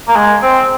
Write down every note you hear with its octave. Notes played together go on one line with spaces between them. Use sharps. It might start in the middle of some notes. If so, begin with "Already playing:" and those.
A#3
G#3
C4